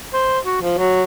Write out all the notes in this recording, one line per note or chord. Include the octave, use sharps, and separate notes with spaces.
C5
F#4
F3
F#3